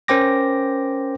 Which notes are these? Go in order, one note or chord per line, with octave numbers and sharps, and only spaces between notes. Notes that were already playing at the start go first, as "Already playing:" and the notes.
C#4 A#4 C5 G5 D6 A#6